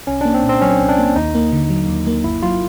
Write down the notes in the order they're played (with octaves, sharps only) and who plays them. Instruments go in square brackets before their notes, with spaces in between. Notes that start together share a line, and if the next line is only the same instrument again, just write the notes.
[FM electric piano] C2 [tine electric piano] C#4
[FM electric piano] A#3 [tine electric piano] D4
[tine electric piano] C4
[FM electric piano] A#2
[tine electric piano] C4
[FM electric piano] F#3 [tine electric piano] C#4
[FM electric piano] C2
[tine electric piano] D4
[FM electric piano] A#3
[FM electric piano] D#2 [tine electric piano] D#4
[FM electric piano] A#3
D3
F#3
D#2
A#3
[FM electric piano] G1 [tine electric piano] E4
[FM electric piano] F#3 [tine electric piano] F4